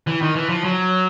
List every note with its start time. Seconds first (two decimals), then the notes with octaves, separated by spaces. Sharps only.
0.07 E3
0.22 D#3
0.36 E3
0.49 F3
0.64 F#3